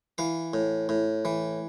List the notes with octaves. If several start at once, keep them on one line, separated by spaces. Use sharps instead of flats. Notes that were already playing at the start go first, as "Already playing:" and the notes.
E3 F5
A2
A2
E3